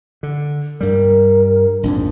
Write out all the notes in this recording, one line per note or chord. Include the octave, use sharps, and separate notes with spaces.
D3
G2 G3 A#4
A#1 F2 G#2 D4